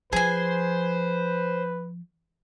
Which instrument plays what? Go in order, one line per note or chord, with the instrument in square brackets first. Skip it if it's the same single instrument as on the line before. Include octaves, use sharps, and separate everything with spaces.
[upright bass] F3 [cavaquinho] G#4 G#5 [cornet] B4 [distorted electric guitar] C5